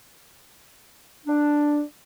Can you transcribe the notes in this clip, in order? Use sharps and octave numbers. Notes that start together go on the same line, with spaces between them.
D4